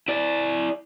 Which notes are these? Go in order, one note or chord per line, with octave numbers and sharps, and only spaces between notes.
E4 D5